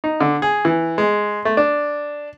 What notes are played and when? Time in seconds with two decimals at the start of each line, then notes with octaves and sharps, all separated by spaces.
0.04 D#4
0.21 D3
0.42 G#4
0.65 E3
0.98 G#3
1.45 A3
1.57 D4